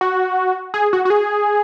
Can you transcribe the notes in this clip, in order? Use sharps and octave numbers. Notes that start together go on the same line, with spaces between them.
F#4
G#4
F#4
F#4
G#4